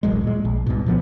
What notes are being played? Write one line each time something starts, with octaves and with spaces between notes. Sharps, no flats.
D1 A1 F#2 G#3
A#2 G#3
A#1
C2 G#2 B2
A#2 F3 A3 B3